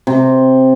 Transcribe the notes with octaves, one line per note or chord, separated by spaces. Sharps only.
C3